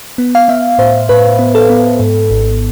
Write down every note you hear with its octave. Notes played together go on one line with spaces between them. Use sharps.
B3
F5
B3 E5
A2 C5
A2 B4
B3
A4
B3
G#2
G#1